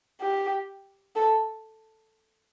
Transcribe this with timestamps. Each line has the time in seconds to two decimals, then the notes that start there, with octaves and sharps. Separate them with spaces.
0.21 G4
1.16 A4